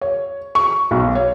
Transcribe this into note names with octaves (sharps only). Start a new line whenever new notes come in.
C#5
C#6
B1
C#5